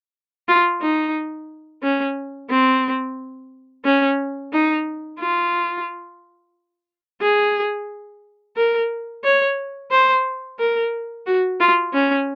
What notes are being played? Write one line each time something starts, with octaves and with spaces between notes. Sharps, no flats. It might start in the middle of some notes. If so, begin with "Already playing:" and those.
F4
D#4
C#4
C4
C#4
D#4
F4
G#4
A#4
C#5
C5
A#4
F#4
F4
C#4